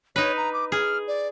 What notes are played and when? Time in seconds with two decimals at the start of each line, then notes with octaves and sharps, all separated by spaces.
0.16 D#4 B4 C#5
0.37 A#5
0.53 D6
0.72 G#4 F6
1.08 D5